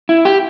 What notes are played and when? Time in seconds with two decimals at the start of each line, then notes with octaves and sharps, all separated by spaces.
0.09 E4
0.25 G4